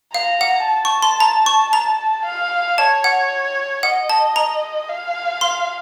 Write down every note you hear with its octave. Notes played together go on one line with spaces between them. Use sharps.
F5 A#5
F#5
A5
C#6
C6
A#5
C#6
A#5
F5
C#5 A5
F#5
D#5 F#5
A5
A#5
F5
C6